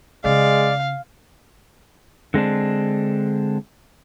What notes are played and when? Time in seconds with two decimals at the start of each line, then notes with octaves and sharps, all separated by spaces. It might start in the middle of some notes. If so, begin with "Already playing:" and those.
0.25 C#3 G#3 D5 F5
2.34 D3 G#3 C4 D4